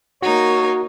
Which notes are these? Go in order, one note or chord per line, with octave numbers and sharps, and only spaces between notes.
A#3 D#4 F#4 A#4 C#5